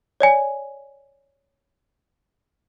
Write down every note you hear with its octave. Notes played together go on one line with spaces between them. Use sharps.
C#5 D5 G#5